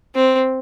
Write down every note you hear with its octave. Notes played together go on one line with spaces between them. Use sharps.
C4